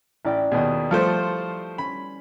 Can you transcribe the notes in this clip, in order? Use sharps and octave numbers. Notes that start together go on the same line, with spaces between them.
A1 E4 D5 G5
D#2 B2 G#4 B4 D#6
F3 G3 A3 C5 C#7
C#4 B5